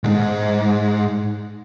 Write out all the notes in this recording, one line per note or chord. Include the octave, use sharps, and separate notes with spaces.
C2 G#2